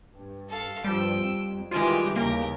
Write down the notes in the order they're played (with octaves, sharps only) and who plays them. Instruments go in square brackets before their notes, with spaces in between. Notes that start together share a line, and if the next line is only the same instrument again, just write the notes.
[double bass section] G2
[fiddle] A4 F5
[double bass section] G2 F3 [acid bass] G3 [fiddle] G5 E6
[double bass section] F2
[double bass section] D#3 E3 G3 [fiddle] G#3 G4 [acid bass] F4
[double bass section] D#2 C#3 [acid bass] A#3 [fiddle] G4 A#4